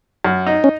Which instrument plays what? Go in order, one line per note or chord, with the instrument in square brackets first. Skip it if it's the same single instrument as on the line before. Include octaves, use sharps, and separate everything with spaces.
[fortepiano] F#2
D#4
[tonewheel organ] C#4